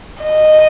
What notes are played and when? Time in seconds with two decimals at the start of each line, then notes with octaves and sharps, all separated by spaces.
0.22 D#5